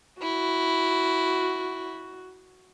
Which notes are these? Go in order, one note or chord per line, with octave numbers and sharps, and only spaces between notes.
E4 F#4